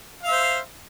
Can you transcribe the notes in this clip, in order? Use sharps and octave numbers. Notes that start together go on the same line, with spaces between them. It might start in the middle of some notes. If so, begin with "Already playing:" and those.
C5 E5 F5